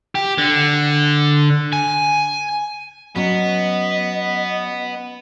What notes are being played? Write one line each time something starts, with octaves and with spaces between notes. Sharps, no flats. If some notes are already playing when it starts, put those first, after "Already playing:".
G4
D3
G#5
F#3 B3 C#4 D#5